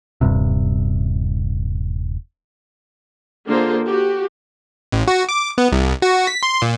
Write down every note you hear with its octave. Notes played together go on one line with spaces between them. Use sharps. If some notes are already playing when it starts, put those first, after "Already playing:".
D#1 G2 C3
D3 A#3 F4 G#4 A4 C5
F#4 G4
A1
F#4
D6
B3
C2
F#4
B6
C6
A#2